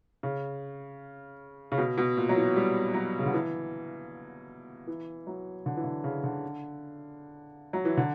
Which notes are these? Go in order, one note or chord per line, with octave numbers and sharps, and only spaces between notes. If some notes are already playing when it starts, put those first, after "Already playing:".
C#3
C#3
B2
B2
A#2
F#3
E3
G3
F#3
C#3
D3
E3
E3
F#3
D3
E3
D3
C#3
D3
F#3
E3
D3